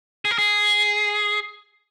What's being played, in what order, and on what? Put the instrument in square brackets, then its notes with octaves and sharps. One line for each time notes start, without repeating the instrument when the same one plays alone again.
[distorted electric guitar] G#4
A#4
G#4